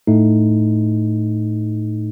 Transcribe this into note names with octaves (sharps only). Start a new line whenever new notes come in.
A2 A3 D#4